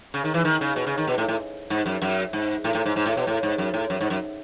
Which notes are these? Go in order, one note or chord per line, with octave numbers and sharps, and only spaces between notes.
C#3
D#3
E3
D#3
C#3
B2
C#3
D#3
B2
A2
A2
G#2
F#2
F#2
G#2
A2
A2
G#2
G#2
A2
B2
A2
G#2
F#2
A2
F#2
G#2
F#2